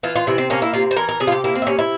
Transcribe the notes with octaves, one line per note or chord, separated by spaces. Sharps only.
E3 F4
F4
C3 E4
C4
A#3 C#4
E4
C3 F4
C5
E3 A#4
A#4
C3 G#4
F4
G4
A#3 E4
C4
E4
C3 C#4
E4